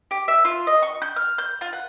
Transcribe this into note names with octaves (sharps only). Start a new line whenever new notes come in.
G4
E5
F4
D#5
C#6
G6
F6
G6
F4
F#5